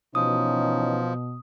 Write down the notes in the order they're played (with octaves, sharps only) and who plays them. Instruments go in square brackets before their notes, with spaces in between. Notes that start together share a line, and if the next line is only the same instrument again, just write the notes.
[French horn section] B2 [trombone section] E3 C#4 D#4 [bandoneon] F3 [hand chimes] D#6